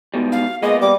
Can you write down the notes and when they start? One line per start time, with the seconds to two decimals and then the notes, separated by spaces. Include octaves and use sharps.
0.14 G#2 B2 G3
0.32 F5
0.63 A#2 G#3 A#3 B3 D#5
0.81 G3 D6